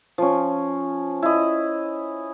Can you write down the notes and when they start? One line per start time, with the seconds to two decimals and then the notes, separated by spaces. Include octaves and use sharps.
0.18 F3 C#4
1.23 E4 D#5